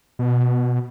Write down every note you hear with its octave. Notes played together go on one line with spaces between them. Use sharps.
B2